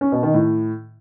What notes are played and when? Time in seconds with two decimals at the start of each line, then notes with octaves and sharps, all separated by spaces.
0.01 C#4
0.12 B2
0.23 D#3
0.34 A2